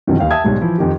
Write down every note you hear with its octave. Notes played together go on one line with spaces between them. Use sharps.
G1 C3 D#3 E3 F#3
D#2 F5 G5
E5 G5 A5 D#6 G#6
B1 G#2 G3
E3 F3 E4
F2 D#3 G4